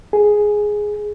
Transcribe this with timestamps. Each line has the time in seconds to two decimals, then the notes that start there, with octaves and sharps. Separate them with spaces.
0.13 G#4